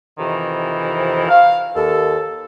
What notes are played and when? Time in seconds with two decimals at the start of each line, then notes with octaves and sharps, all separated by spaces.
0.19 F2 C3 D#3 E3
1.29 F5
1.75 D#2 A4